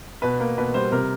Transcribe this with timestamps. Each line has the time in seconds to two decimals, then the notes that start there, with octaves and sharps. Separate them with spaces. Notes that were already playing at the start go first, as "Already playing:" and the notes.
0.22 B2 B4
0.40 A#3
0.58 B2 B4
0.74 G3 C5
0.92 C3 A#4